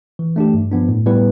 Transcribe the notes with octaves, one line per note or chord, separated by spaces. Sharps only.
E3
A3 D4 G4
G2
F3 B3 D4
A2
G3 B3 E4 B4